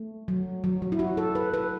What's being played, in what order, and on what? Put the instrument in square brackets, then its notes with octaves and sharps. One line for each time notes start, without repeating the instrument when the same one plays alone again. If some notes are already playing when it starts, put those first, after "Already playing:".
Already playing: [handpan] A3
F#3
F#3
F#3
E4
F#4
A4
B4
B4